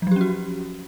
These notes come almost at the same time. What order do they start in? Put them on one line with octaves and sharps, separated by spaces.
F3 F#3 G4 C#4 F#4